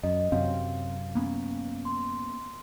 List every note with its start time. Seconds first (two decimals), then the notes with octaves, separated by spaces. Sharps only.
0.03 F#2 D#5
0.32 F#2 C3 F#3 C4 F5
1.15 A#3 B3 C#4
1.85 C6